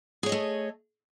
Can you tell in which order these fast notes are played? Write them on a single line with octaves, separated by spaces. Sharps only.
G#4 C#5 D#5 A3